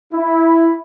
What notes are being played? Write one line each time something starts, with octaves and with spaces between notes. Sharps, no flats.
E4